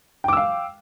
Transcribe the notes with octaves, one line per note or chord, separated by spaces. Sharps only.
F5 G5 D6 E6